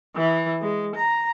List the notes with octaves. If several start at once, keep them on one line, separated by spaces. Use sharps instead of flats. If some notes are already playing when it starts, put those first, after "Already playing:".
E3
G#3
A#5